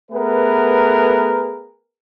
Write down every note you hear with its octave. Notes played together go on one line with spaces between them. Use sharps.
A3 B3 G#4 A#4 B4